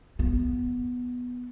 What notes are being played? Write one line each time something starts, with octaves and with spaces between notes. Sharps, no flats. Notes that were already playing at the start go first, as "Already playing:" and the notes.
B3